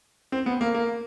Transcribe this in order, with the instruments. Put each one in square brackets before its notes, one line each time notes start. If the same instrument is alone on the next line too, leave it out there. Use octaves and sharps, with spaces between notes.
[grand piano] C4
B3
A#3
A#3